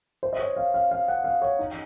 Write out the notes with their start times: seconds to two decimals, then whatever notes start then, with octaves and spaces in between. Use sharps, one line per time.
0.23 C5
0.33 D#5
0.39 C#5
0.56 F5
0.74 F5
0.91 F5
1.08 F#5
1.24 F5
1.42 C#5
1.59 D#4